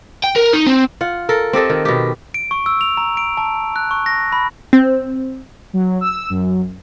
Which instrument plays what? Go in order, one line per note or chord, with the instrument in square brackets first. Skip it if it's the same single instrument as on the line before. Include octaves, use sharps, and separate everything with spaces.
[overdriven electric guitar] G5
A#4
D#4
C4
[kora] F4 F#5
A4 A#4
C4 G4 A4 D#5
D#3
B2 G4
[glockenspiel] D7
C#6
E6
F7
A#5
D7
A5
F#6
C#6
A#6
B5
[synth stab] C4
[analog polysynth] F#3
E6
F#2